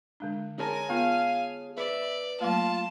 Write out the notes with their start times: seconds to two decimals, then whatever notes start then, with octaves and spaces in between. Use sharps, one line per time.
0.20 D3 G#3 D4
0.59 G#4 A#4 C#5 G#5 A5
0.90 B3 F4 F5
1.78 B4 D5 E5
2.41 F#3 A3 A#3 F4 A5